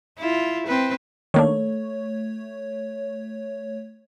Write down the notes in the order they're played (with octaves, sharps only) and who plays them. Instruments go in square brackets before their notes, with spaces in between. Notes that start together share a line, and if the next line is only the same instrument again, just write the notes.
[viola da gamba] E4 F4
C4 B4
[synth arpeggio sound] D#3 A#3 D4 [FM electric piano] A3 C#5